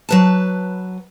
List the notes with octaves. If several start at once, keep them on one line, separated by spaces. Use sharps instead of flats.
F#3 B4 A5